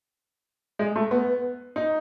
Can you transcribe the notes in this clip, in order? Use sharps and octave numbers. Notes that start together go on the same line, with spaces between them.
G#3
A3
B3
D#4